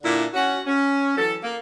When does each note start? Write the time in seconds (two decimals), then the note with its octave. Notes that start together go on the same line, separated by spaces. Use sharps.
0.04 A#2 D3 D4 E4
0.34 C#4 F#4
0.67 C#4
1.17 E3 F#3 A4
1.43 A#3